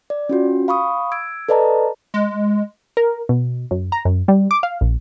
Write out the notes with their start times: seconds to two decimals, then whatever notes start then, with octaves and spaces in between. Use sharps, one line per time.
0.10 D5
0.29 C#4 F4 F#4
0.68 F5 B5 C#6 D#6
1.12 E6 G#6 D7
1.49 A4 B4 D5 D#5 A5 A#5
2.14 G#3
2.97 A#4
3.29 B2
3.71 F#2
3.92 A#5
4.05 F#2
4.28 G3
4.51 D6
4.63 F5
4.81 A#1